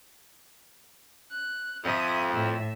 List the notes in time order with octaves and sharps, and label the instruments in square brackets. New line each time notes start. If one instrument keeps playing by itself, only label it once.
[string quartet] F#6
[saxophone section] F2 [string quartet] E5 D#6
[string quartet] A2 E5